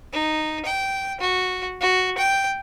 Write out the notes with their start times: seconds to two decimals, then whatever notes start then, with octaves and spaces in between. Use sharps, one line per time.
0.13 D#4
0.65 G5
1.20 F#4
1.81 F#4
2.18 G5